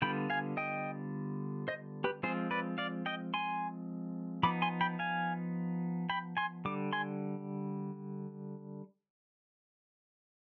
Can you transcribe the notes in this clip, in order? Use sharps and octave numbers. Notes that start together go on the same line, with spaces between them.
D3 G3 B3 F4 G5 B5
F5 G#5
D#5 G5
C5 D#5
G4 B4
F3 G#3 C4 F4 G#4 C5
B4 D5
D5 F5
D#5 G5
G#5 C6
F3 B3 D#4 B5 D6
G#5 C6
G5 B5
F5 G#5
G5 B5
G#5 C6
D3 G3 D6
G#5 C6